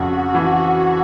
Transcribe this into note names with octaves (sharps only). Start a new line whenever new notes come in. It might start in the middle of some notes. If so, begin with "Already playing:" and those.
Already playing: F2 C#3 F#4
E3